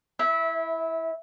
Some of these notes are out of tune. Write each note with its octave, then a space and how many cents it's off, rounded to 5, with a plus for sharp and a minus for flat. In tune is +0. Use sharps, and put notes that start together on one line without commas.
E4 +0 E5 -20